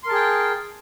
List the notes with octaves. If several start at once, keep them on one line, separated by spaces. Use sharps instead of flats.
G#4 A#4 G5 A5 C6